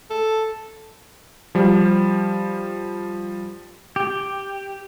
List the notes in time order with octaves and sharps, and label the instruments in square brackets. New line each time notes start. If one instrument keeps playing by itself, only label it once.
[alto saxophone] A4
[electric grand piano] F3 G3
[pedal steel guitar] G4